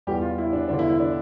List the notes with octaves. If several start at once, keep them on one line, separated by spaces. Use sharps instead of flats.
E2 E3 G3 G4
F4
E4
D4
E2 D3 F3 D4
E4
E4
D4